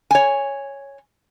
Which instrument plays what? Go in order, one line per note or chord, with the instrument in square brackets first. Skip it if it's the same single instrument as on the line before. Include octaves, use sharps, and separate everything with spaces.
[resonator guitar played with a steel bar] C#5 G#5